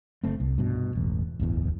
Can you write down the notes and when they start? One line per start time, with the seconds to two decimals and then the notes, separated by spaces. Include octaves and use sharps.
0.24 F#1 A3 C4
0.40 C2
0.58 G2 B2
0.95 E1 A1
1.39 D1 G1 E2